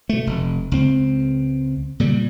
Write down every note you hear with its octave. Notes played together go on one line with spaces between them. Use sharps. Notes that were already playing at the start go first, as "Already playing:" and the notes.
B2 A3
F1
C#2 C4
A#2 C#3 G3